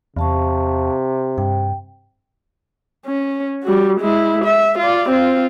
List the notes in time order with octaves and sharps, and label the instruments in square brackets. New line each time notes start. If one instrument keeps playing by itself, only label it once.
[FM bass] E2 [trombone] C3 [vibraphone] F5 A5 C#6
[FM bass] G2 [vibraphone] G5
[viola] C#4
G3 F#4
G#3 E4
E5
F4 D5
C4 F4